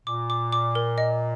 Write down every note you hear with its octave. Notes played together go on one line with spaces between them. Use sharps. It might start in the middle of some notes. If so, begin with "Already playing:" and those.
A#2 D6
D6
D6
A#4
D#5